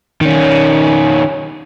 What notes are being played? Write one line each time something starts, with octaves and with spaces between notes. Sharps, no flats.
D#3 C#4